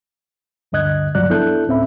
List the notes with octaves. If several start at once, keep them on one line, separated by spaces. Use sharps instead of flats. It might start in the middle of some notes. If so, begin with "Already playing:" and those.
D2 G2 D3 D#5 F#6 G#6
C#2 G2 F3 F#3 D5 F#6
B3 D4 E4 A4 F#6 G6
D2 A2 C4 C#4 E5 B5